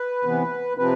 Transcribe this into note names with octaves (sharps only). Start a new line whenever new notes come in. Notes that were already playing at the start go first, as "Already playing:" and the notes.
Already playing: B4
C3 E3 B3
C3 F3 C4 B4